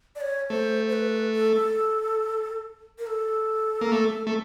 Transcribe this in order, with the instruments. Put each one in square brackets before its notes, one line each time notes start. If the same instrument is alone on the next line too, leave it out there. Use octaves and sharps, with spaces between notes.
[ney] D5
C#5
[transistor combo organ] A3 [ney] C5
[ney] C5
B4
A4
A#4
A4
[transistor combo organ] A#3
A3
A3